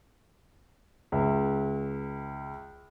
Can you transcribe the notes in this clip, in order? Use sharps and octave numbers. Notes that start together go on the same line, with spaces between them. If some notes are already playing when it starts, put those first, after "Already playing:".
C#2 E5